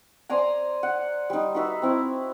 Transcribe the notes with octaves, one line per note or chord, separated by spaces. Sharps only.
C5 D5 G#5 A#5
F#5
G3 D#4
D#4 F#4 B4 E5
C4 E4